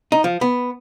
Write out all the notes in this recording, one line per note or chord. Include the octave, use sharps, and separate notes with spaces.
D#4
F3
B3